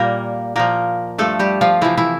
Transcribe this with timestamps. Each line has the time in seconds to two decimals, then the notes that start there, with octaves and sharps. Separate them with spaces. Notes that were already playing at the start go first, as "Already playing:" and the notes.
Already playing: A#2 G3 A#3 A#4
0.56 A#2 F3 A#3 A#4
1.18 G2 F3 A3 A4
1.39 G3 G4
1.61 F3 F4
1.81 C3 E3 F3 E4
1.97 E3 E4